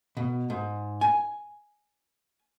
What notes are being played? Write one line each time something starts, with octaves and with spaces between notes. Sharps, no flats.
B2
G#2
G#5